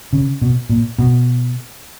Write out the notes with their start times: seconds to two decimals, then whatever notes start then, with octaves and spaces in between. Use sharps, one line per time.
0.13 C#3
0.42 B2
0.70 A#2
0.99 B2